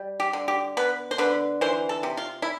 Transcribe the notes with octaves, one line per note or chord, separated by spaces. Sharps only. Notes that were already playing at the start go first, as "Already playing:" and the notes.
Already playing: G3
G4
D3
G4
B3 B4
C5
D3 B4
E3 C5
A4
C3
F4
E4